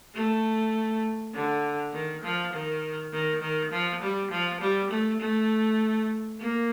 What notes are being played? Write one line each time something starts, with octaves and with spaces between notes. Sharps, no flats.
A3
D3
D#3
F3
D#3
D#3
D#3
F3
G3
F3
G3
A3
A3
A#3